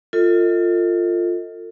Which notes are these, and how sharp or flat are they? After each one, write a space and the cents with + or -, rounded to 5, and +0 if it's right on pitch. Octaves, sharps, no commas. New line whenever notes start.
F4 +0 A4 +35 D#5 +25